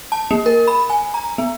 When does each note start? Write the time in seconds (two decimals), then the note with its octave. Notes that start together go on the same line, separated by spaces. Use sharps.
0.12 A5
0.31 A#3
0.46 A#4
0.68 B5
0.90 G#5
1.14 A#5
1.38 B3